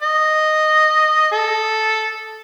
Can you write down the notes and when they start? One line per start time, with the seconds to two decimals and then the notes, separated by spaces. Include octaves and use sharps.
0.02 D#5
1.32 A4